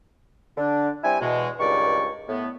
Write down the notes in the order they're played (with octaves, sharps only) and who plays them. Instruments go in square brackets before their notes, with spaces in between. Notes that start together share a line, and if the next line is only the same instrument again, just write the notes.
[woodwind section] D3 D4
G3 C4 E4 G#5
E2 B2 G#3
C#2 G2 D#3 D5 C#6
A2 B3